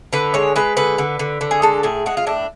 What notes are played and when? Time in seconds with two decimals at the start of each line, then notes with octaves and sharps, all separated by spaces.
0.13 D3 B4
0.34 G#3 C#5
0.56 G#3 B4
0.77 D3 B4
0.98 D3
1.19 D3
1.41 D3
1.51 G#4
1.62 G#3 A4
1.83 A2 G#4
2.06 G#3 F#4
2.17 F4
2.27 A2 D4